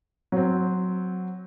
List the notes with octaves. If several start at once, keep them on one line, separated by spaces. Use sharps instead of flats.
F#3 C4